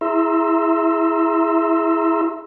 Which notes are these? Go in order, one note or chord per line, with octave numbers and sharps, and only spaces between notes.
E4 G#4 E5 A#5 C6 E6